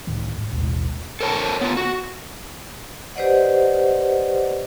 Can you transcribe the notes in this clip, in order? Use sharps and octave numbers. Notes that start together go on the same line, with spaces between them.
C#2 A2 D#3 F#3
G#2
A1 D#2 B2 G#3
A4 A#4 C#5 G#5 A5
B3 F4
F#4
G4 B4 C5 D5 D#5 F#5